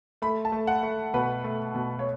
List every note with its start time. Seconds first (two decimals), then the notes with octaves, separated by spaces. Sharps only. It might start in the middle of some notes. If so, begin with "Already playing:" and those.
0.22 A3 B5
0.45 A5
0.52 A3
0.67 F#5
0.83 A3
1.14 B2 B4
1.44 A3
1.75 B2
1.99 C#5